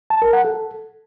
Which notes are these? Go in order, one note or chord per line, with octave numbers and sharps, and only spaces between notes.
A5
A#4
F#5
A4